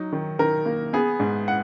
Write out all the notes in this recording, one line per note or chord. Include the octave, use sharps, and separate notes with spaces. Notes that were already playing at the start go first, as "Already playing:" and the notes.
Already playing: F#3 D#4
D#3
D#3 A#4
A#3
B3 G#4
G#2
F#5